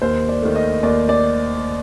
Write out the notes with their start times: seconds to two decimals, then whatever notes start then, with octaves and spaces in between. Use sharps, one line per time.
0.02 D#2 C5
0.29 D5
0.42 D#3 A3
0.56 D#5
0.83 D#2 D5
1.09 D5